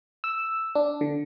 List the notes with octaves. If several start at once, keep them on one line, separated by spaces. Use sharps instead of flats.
E6
D4
D3